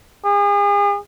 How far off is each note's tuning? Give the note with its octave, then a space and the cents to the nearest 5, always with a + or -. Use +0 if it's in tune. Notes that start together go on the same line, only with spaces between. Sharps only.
G#4 -40